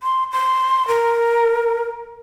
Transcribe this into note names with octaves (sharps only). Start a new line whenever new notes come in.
C6
C6
A#4